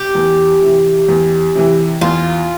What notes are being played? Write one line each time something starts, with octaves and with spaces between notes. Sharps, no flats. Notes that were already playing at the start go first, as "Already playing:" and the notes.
Already playing: G4
E2
C3 E3
E2
C3 E3
E2 F4